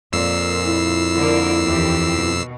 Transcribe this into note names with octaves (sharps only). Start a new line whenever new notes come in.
F2 A#2 E6 C7
E4
D3 A#3 A#4
D#2 E3 G4
B2